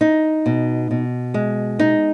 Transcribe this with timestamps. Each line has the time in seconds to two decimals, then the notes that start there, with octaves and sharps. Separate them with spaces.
0.01 D#4
0.46 B2
0.91 B2
1.34 G#3
1.79 D#4